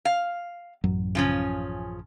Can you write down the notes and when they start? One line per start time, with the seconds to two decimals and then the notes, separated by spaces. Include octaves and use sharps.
0.05 F5
0.84 A1 F#2 F#3
1.15 C#3 F3 C#4